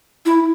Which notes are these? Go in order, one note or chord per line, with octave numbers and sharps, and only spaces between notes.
E4